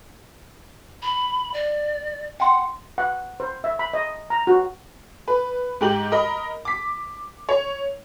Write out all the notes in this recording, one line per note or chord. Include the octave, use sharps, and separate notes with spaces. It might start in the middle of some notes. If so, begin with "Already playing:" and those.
B5
D5
F#5 G5 C6
F#5
C5
E5
B5
D#5
A#5
F#4
B4
G#2 G4 F#7
A#4 D#5 B5
D6 B6
C#5